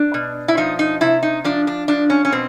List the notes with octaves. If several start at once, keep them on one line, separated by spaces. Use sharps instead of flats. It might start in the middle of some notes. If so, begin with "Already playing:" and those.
Already playing: D4
B2
E4
F3 D#4
D#4
C3 E4
D#4
F3 D4
D4
F3 D4
C#4
C#4
B2 C4